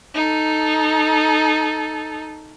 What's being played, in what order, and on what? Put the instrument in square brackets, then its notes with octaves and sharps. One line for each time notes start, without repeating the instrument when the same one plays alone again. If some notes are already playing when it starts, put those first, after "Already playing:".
[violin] D#4 A4